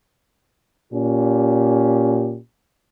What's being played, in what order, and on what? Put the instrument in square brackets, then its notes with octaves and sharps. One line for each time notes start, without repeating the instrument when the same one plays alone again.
[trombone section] A#2 C#4 G4